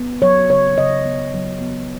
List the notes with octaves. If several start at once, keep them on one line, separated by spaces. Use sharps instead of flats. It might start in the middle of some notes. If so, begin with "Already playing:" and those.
Already playing: B3
F#3 C#5
C#3 C#5
C#3 D#5
B3
F#3
B3